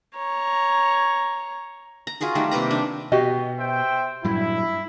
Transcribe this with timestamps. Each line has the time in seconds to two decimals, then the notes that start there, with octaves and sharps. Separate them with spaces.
0.15 C#5 A#5
2.07 A#5
2.21 F4 F#4 G#4 A#4
2.35 D#3 G3 A3
2.51 C3 A#3 B4 A#5
2.71 D4
3.12 B2 F#4 G4 D#5
3.59 C5 E5 G5
4.24 G2 A#2 F#3 E4